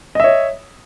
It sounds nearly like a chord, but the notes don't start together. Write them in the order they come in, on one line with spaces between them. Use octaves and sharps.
D#5 E5 C#5